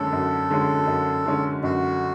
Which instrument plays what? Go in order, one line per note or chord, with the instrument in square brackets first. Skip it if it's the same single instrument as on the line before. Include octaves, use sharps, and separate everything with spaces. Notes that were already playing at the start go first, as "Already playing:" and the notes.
Already playing: [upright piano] F#2 D3 G#3 C#4 [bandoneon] A4
[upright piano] F#2
D3 G#3 C#4
F#2
D3 G#3 C#4
[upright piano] F#2 [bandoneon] F#4